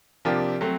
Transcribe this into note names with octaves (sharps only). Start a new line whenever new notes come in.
C3 F3 A#3 D4 G4
F#3 A3 C4